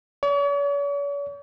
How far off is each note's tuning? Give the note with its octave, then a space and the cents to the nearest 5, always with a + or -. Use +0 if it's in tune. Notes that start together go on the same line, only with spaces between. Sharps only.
C#5 +45